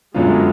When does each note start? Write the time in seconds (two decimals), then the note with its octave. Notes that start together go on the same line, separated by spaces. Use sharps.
0.14 F#2 D3 F#3 G#3 B3 F4